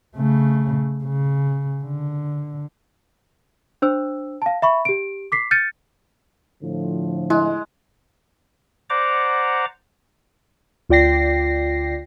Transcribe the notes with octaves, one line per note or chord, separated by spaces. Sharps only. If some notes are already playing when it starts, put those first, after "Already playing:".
C#3 A3
C#3
D3
D4 C5 E6
F5 A5
E5 B5 C#6
G4 D7
D6 B6 C7
F6 G6 A6 C#7 D#7
A2 D3 F3
G#3 E4
C5 D5 F#5 A#5 D6
D2 F4 D5 G5 A#6 C7